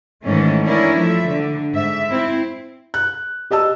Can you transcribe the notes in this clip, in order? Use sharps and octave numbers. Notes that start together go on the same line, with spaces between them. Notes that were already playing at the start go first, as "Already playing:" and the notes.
G#2 D#3 E3 A3 C#4
C#4 D4 E4 A#4
F3 A3 E5
D3
G#2 E5
C4 E4
F#6
G4 D#5 A5 E6